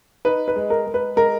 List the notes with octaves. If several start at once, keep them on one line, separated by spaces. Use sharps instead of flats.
D#4 B4
B4
G#3
A#4
G#3
B4
G#3 A#4